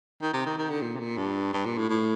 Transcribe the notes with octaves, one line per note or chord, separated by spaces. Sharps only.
D#3
C3
D#3
D#3
D3
A#2
C3
A#2
G2
G2
A#2
A2
A2